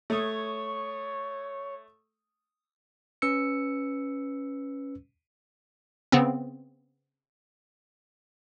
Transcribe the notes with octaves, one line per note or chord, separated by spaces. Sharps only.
A3 C#5 D#6
C#4 B4 E6 C#7
C#3 B3 C4